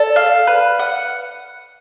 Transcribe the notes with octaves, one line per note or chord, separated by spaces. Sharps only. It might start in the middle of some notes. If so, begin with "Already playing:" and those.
Already playing: A4 D5
F5
B4
F#5